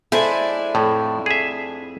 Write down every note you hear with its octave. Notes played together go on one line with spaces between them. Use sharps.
G#3 D4 E4 A4 C5 G#5
F2 A2
G#4 E5